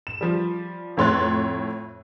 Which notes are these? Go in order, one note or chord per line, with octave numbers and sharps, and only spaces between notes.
E7
F3 G3
F2 A2 C#5 C6 F#6 A6